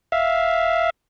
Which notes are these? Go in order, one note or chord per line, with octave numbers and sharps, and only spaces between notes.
E5 F5